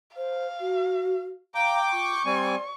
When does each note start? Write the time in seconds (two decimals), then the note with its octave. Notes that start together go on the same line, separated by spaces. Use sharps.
0.17 C5 F5
0.60 F#4
1.55 F5 G5 A#5 D6
1.93 F4 C#6
2.26 G3 C4 D5 G#5